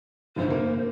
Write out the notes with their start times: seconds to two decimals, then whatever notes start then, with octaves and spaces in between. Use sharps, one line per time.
0.36 F1 D2 C5
0.50 A#3